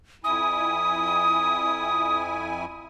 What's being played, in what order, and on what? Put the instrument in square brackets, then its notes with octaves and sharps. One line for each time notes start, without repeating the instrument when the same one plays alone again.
[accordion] F2 E4 G#5 [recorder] D#6